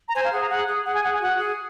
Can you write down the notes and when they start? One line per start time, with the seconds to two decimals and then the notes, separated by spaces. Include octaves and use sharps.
0.08 A#5
0.15 C5 G#5
0.25 F5
0.33 G#4 F#5
0.42 A#5
0.50 G#4 F#5
0.68 G#4
0.85 G#4 F#5
0.94 G#5
1.03 G#4 F#5
1.13 G#5
1.21 F#4 F#5
1.38 G#4